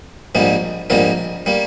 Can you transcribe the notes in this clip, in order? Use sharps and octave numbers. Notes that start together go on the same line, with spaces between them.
A#1 G#2 G3 A#3
A#1 G#2 G3 A#3 A#4
G3 A#3